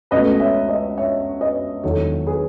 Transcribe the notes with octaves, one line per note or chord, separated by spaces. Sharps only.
C#2 B2 A3 B4 D#5
C#5 E5
B4 D#5
C#5 E5
B4 D#5
E1 E2 D#3 F#3 A4 C#5
G#4 B4